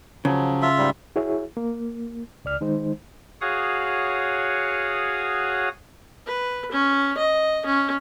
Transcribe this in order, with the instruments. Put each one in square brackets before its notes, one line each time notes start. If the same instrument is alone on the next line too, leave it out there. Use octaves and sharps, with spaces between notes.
[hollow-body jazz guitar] C#3 [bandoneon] F3 F#3
[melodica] F4 E5
[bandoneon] G#2 G3
[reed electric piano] E4 F#4 G#4 C#5 E5
A#3
C#2 D5 F6
D#3 G#3 D#4 C5
[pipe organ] F#4 G#4 C#5 F5 F#5 D#6
[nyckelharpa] B4
C#4
D#5
C#4